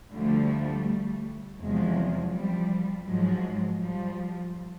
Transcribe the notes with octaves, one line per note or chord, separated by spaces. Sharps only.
D2 D3 F3 G3 A3
E2 C3 F3 F#3 G#3
F3 G3
G#2 F3 F#3 G#3
F3 G3